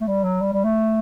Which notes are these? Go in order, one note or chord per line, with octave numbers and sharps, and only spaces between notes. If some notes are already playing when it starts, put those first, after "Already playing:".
A3
G3
F#3
G3
G3
A3